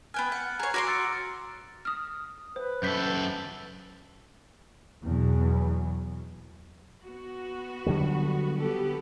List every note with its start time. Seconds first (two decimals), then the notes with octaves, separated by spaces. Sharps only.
0.14 B3 G5 G#5 F6 F#6
0.32 F#5
0.60 G#4 C#5 A#5
0.74 F#4 A#5 C6 D6 D7
0.87 E6 A6 C#7
1.85 D#6 F6
2.56 B4 C5
2.83 F#2 A4 G6 B6
5.04 E2 B2 F#3
7.05 B3 F#4
7.86 D3 F#3 G3
8.58 B3 G4 A4